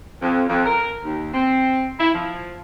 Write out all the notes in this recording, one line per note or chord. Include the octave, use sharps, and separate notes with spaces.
F2
F2
A#4
D#2
C4
E4
F3